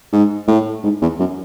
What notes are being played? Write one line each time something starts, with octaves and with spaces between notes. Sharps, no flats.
G#2
A2
G#2
E2
F#2